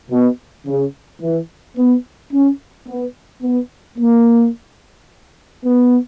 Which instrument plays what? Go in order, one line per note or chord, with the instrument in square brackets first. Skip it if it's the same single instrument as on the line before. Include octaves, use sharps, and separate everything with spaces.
[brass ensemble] B2
C#3
E3
B3
C#4
B3
B3
A#3
B3